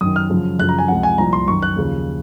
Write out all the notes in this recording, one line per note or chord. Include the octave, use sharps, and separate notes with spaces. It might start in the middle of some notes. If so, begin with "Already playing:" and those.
F#2 D#3 D#6
F6
F#2 C#3 F3
F#2 C#3 F3 F#6
A#5
G#5
C#2 C3 F3 F#5
G#5
C2 A#2 F3 A#5
C6
F#2 D#3 C#6
F#6
D#2 C#3 F3